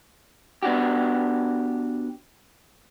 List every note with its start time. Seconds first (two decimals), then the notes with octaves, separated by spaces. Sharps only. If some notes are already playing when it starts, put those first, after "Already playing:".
0.63 B3 D4 F#4 G4